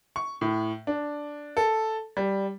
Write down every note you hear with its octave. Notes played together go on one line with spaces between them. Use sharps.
C#6
A2
D4
A4
G3